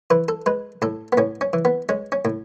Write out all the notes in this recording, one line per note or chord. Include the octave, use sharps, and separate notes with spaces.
E3 B4
A4
G#3 B4
A2 A4
B3
A2 C#4
C#4
E3
B3
G#3 C#4
C#4
A2